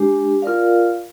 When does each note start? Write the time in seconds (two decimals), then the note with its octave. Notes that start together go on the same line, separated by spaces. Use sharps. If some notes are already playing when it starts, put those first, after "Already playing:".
Already playing: G#3 D4 G4
0.42 F4 A#4 D5 F5